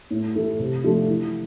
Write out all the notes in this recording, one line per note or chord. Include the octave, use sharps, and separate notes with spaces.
A2
E3 A3 E4
C3
F3 A3 D4 F4
E3